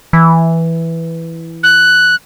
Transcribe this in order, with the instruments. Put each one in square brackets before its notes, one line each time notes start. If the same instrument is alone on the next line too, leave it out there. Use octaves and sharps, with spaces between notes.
[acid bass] E3
[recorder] F#6